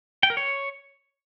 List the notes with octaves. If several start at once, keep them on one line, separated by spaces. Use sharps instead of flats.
G5
A#4
C#5